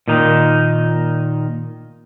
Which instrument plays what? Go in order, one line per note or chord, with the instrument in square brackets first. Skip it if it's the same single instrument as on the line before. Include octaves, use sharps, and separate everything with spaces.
[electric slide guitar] A#2 D#3 D#4